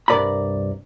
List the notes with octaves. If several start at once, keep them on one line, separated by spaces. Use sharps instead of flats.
C2 G2 A#4 D5 A#5 B5